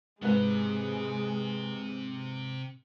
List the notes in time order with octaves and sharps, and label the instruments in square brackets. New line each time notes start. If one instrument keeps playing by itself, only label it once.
[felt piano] G#2 B4 [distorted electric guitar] C3 [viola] G#3